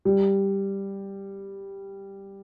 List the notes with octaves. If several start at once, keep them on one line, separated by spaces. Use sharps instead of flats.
G3